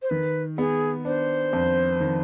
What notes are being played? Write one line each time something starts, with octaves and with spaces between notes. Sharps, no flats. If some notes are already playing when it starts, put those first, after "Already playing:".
C5
D#3 B4
B3 G#4
D4 C5
F2
D#3